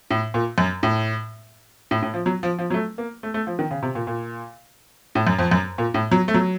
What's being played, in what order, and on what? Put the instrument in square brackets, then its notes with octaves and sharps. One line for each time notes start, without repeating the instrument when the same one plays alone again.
[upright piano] A2
A#2
F#2
A2
A2
A2
F3
F#3
F3
F3
F#3
A3
A#3
A3
A3
F3
D#3
C#3
C3
A#2
A#2
A2
F#2
F2
F#2
A#2
A2
F#3
A3
F#3